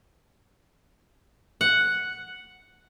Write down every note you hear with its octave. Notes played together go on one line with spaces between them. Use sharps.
F#5